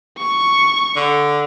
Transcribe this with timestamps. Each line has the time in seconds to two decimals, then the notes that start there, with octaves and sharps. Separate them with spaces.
0.18 C#6
0.96 D3